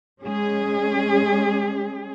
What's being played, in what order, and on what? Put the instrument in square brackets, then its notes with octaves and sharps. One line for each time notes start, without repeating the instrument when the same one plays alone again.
[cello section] G#3 C#4 G#4